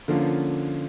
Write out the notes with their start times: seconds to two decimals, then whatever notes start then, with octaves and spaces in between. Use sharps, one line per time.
0.08 D3 F3 A#3 C#4 F4